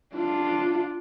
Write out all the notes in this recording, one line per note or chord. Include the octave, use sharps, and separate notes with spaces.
D4 F4